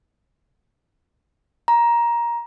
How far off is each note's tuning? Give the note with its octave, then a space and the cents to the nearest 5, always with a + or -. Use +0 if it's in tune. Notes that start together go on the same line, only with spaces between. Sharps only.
A#5 +15